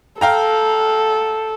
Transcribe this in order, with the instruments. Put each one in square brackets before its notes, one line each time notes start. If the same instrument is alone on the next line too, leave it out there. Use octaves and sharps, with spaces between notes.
[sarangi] A4 [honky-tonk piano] F5 G5 A#5